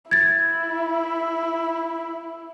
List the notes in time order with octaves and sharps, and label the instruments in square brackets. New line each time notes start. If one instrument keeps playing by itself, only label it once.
[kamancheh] E4 [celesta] G#6 A6